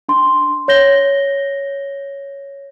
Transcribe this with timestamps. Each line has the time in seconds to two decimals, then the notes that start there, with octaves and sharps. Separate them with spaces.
0.09 D4 C6
0.68 C#5 G6 A#6 G7